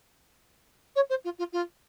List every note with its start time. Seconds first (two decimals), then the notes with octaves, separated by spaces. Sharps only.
0.96 C#5
1.10 C5
1.25 F4
1.39 F4
1.53 F4